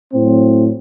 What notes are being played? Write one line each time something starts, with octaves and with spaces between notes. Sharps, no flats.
A2 F#3 C4